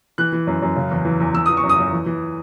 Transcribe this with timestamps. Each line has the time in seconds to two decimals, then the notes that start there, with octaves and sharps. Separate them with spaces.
0.18 E3 F#6
0.32 E3
0.47 F#2
0.62 F#2
0.76 C#3
0.91 E2
1.05 E3
1.20 E2
1.34 E3 E6
1.46 E3 D#6
1.57 C#6
1.63 F#2
1.69 D#6
1.78 F#2
1.93 E3
2.06 E3